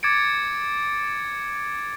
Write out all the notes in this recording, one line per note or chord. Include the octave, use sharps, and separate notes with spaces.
D6 G#6 A6 C#7 D7